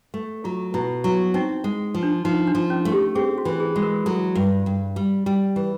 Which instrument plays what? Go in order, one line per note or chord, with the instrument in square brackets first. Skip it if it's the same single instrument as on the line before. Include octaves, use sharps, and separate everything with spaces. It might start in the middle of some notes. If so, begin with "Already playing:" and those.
[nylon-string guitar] A3
[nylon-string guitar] F#3 [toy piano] F4
[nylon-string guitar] B2 [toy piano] E4
[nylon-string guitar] F#3 [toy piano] E4
[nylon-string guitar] C4 [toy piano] D#4
[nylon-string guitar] G#3
F3
[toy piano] D4
[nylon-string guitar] F3 [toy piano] D#4
[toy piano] D4
[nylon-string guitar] F3
[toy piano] C#4
[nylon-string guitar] A3
[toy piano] G4
[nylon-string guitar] C4 [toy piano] G#4
[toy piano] F#4
[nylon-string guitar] E3
[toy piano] G#4
[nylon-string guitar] G#3
[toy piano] A#4
[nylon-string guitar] F#3 [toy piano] A4
[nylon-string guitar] G2
G2
G3
G3
E3